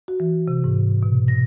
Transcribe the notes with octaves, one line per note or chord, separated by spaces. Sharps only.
F#4
E3
C3
G#2
B2
A#6